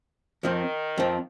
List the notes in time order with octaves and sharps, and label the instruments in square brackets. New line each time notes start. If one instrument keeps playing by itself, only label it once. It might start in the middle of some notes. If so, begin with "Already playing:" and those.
[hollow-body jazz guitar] F2 F3 C4 [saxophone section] D#3
[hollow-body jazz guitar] F2 F3 C4